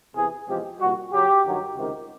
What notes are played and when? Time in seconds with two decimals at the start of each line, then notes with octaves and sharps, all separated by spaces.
0.16 E2 C3 E3 G#4
0.48 E2 C3 F3 G#3 G4
0.80 C2 A#2 G3 F#4
1.13 F#2 C#3 F#3 G4
1.45 G2 D#3 F#3
1.78 C#2 C3 D#3